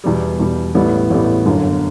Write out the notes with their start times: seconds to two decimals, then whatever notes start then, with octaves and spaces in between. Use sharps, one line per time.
0.04 E2 B2 G3
0.40 E2 B2 G3
0.74 A1 A2 G3 B3
1.10 A1 A2 G3 B3
1.45 G1 F#2 D3